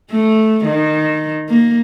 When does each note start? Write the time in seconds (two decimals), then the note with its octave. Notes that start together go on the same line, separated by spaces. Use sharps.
0.10 A3
0.65 D#3
1.49 A#3